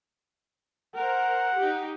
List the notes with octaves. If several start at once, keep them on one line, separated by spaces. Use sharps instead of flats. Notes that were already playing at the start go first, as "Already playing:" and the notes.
A#4 C5 F#5
D#4 G4